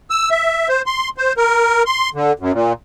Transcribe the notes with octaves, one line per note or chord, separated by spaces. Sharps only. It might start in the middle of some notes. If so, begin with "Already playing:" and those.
E6
E5
C5
C6
C5
A#4
C6
D3
F#2
A#2